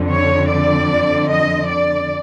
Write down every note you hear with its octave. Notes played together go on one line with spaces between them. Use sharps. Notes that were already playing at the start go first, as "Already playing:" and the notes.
Already playing: F2 D3
C#5
D5
D#5
D5